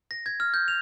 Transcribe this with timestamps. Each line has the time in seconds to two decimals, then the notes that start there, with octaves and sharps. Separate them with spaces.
0.11 A#6
0.26 G#6
0.40 F6
0.54 G6
0.68 F7